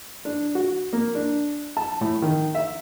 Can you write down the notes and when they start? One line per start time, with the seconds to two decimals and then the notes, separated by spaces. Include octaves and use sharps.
0.25 D4
0.55 F#4
0.93 A#3
1.15 D4
1.77 A5
2.01 A2
2.22 D#3
2.55 E5